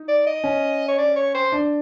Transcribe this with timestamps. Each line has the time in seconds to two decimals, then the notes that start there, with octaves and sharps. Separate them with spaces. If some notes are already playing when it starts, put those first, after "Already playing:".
Already playing: D#4
0.08 D5
0.26 D#5
0.44 C#4
0.88 C#5
0.98 D5
1.16 C#5
1.34 C5
1.52 D4